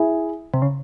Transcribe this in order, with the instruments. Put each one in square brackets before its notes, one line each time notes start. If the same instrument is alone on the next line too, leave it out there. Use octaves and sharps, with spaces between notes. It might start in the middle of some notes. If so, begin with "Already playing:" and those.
Already playing: [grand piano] E4 G#4
[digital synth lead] C3
C#3